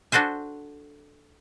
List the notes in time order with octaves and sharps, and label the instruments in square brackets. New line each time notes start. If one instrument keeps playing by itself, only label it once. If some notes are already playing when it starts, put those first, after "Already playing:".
[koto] D4 F#4 A4 C5 G#5